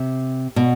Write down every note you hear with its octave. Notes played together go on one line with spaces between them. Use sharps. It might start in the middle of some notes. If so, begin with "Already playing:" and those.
Already playing: C3
B2